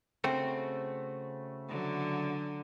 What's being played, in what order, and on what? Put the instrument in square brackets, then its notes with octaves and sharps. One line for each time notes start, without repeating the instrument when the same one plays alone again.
[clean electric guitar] C#3 A3 F#4 [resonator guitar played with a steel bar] C4
[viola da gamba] D3 F#3